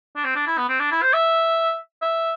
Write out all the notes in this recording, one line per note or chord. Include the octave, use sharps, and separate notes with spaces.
D4
C4
D4
E4
B3
C4
D4
E4
C5
E5
E5